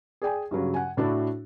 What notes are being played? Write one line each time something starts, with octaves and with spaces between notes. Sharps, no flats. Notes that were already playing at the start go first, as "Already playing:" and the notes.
G#4 D5 G5 G#5
G2 C#3 F#3
F#5 G#5
A2 D4 E4 F#4 A5